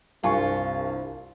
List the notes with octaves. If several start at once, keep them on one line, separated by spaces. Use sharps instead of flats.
C2 G2 F4 G#5 C#6